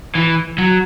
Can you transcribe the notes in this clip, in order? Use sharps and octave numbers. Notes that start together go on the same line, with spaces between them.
E3
F#3